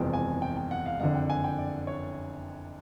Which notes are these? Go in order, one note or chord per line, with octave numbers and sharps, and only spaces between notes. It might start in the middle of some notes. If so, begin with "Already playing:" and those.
Already playing: F#1 E2 C3 F3 G#3 G5
G#5
G5
G5
F#5
F5
F#1 F2 D3 F#5
G5
G#5
G5
D5
C#5